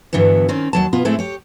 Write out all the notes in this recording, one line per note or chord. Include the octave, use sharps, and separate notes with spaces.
G2 D3 E3 F#3 B3
D#3 C4 C#4
D#2 F#3 A5
B2 B3 F4
A2 G#3 A3 C4 E4
G4 C#5